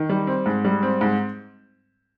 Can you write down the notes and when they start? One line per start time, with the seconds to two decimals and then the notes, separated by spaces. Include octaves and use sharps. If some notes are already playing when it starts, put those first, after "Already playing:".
Already playing: D#3
0.10 G3
0.27 C4
0.46 G#2
0.65 G3
0.82 C4
1.01 G#2